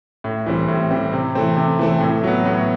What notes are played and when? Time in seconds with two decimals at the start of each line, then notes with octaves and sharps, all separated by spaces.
0.24 A2
0.46 E3 G3 C4
0.68 A2
0.91 E3 G3 C4
1.13 C3
1.35 E3 A3 C4
1.57 C3
1.79 E3 A3 C4
2.00 A2
2.24 F#3 B3
2.45 A2